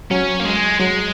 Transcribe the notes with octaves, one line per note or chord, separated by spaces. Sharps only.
F#3 C#4
A#3
G#3
F#3 G#3